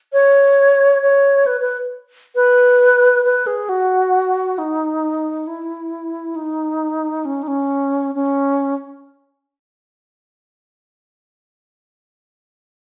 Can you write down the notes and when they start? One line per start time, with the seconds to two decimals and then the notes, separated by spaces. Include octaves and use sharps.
0.13 C#5
1.02 C#5
1.46 B4
1.61 B4
2.35 B4
3.24 B4
3.47 G#4
3.69 F#4
4.58 D#4
5.47 E4
6.36 D#4
7.25 C#4
7.43 D#4
7.48 C#4
8.15 C#4